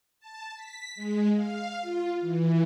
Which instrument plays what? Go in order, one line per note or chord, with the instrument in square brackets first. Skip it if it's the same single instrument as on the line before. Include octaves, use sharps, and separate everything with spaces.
[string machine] A5
B6
G#3
F5
F4
E3